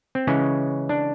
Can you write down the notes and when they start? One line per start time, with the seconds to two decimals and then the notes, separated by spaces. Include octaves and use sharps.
0.15 C4
0.27 C#3 E3 G#3 C#4
0.89 D4